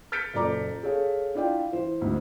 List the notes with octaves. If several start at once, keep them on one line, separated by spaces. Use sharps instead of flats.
F6 G6 A6 B6 C#7 D7
F#1 A#2 A4 D5 A#5 D6
G#4 A4 C#5 F5
D4 E4 F4 D5 F5 G5
E3 C5
D2 G#2